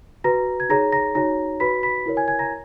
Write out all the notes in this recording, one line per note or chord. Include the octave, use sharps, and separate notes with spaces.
F#4 B4 A#5 A#6
G#6
D#4 G#4 C#5 A#5 A#6
A#5 A#6
D#4 F#4 C#5 A#5 A#6
F#4 B4 B5 B6
B5 B6
E4 A#4 C#5
G#5 G#6
G#5 G#6
A#5 A#6